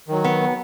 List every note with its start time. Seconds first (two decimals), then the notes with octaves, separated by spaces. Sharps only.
0.08 D#3 F#3
0.24 B3